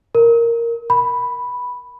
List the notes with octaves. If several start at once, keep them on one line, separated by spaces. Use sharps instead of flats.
A#4
B5